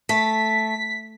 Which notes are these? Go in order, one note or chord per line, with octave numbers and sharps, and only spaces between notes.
A3 B6